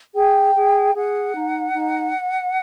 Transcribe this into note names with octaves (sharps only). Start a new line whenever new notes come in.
G#4 G5
G#4
G#4 F#5
D#4
D#4